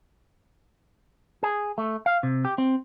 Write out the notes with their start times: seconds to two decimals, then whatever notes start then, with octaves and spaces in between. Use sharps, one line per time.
1.43 G#4
1.78 A3
2.06 F5
2.23 C3
2.45 G4
2.58 C4